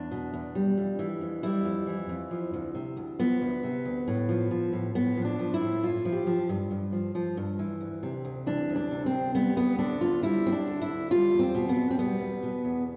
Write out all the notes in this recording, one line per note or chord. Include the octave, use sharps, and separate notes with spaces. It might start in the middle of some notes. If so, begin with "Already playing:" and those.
Already playing: E2 D4
B2
E2
G3
F2
E3
F2
G3 E4
F2
E3
F2
F3
D2
C3
D2
F3 B3
D2
C3
D2
A2
F3
F3
A2
A2 B3
F3
D4
F3
E4
A2
G2 F4
F3
G4
F3
G2
G2
F3
F3
G2
E3
D2
C3
D2
E3 D4
D2
D4
C3
C4
D2
G3 B3
D2 B3
D3 D4
D2 F4
G3 E4
D2 C4
D4
D3
E4
D2
G3 F4
E2
C4
B2
B3
E2
C4
G3 B3
E2
B2
E2